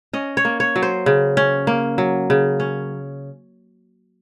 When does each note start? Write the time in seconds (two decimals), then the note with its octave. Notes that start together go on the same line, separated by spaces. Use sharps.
0.13 C#4 D#5
0.37 C#5
0.45 A#3
0.60 C#5
0.76 F#3
0.82 C5
1.06 C#3
1.37 C#4
1.67 A#3
1.98 F#3
2.30 C#3
2.60 C#4